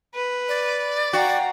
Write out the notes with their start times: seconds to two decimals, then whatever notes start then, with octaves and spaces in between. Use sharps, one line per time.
0.15 B4
0.49 D5
1.13 F#4 F5 G5 A#5